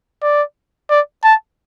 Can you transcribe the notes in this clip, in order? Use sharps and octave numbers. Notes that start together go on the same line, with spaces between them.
D5
D5
A5